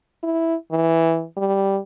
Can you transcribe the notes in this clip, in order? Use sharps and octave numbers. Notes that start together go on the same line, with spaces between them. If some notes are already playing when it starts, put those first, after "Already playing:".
E4
E3
G3